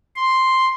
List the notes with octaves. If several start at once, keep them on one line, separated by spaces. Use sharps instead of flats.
C6